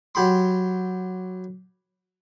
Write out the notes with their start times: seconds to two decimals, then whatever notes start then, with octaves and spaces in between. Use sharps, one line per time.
0.15 F#3 G4 B5 C6